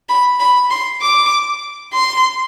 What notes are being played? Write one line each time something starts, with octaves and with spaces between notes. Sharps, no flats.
B5
B5
C6
D6
C6